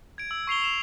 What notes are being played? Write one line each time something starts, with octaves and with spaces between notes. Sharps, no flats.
G#6 D7
E6
C#6 C7 F7 G7
E6 E7 F7